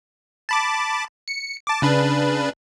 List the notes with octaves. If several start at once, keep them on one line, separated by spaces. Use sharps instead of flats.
A5 B5 D6
C#7
A5 D6
C#3 D4 B4